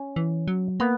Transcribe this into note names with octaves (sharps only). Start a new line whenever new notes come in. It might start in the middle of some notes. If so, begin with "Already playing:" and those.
Already playing: C#4
E3
F#3
A#3 B3